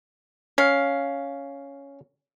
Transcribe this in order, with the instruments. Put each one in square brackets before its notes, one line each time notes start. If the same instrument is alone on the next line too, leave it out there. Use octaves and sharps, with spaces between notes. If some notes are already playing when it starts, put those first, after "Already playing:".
[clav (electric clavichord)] C#4 [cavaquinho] F5